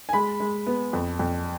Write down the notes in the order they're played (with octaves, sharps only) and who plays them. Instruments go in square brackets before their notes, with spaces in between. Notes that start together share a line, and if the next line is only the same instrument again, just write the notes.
[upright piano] G#5
G#3 B5
G#3
B3
F2
F2